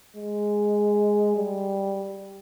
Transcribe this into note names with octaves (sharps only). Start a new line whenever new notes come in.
G#3
G3